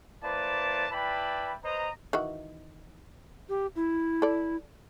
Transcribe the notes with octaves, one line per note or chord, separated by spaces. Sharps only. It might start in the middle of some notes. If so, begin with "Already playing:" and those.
A#3 E4 B4 C5 D5 A5
E4 B4 D5 G5 A5 B5
B4 C5 D#5 A#5
D#3 E3 F#4
G4
E4
A4 D5